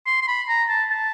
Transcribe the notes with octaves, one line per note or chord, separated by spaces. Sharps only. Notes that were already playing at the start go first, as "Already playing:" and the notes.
C6
C6
B5
A#5
A5
A5